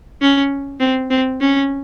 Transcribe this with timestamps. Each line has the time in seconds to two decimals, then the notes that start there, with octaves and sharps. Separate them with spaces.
0.21 C#4
0.80 C4
1.10 C4
1.41 C#4